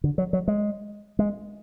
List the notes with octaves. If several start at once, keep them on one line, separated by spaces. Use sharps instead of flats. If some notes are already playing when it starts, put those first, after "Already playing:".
D3
F#3
F#3
G#3
G#3